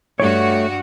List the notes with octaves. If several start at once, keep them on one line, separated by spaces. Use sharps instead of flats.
G2 G3 A3 F#4 C#5